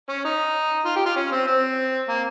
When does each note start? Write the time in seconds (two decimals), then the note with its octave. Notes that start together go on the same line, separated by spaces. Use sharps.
0.09 C#4
0.25 D#4
0.85 F4
0.96 G4
1.06 F4
1.16 C#4
1.32 C4
1.47 C4
2.09 A#3